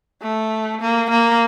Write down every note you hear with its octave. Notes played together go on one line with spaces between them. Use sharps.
A3
A#3
A#3